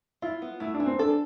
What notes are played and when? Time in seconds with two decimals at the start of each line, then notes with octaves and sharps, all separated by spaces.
0.22 E4 F4
0.42 B3
0.60 A3 E4
0.74 D4
0.80 E3
0.86 C4
0.99 D4 A4